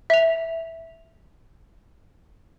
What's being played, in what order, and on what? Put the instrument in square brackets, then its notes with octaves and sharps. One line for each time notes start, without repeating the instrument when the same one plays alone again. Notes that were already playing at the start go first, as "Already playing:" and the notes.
[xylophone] E5 F7